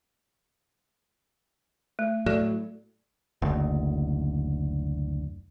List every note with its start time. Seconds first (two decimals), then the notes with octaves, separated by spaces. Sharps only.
1.99 A3
2.26 A2 F#3 A3 A4 D5
3.42 F#1 D2